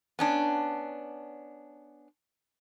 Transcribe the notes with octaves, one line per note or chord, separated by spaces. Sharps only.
B3 C#4 D4